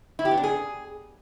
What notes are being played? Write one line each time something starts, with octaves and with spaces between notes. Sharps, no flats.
E4
G4
B3
D4
G#4